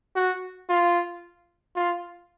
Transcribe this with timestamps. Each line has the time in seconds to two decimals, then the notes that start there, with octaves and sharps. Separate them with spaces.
0.16 F#4
0.69 F4
1.76 F4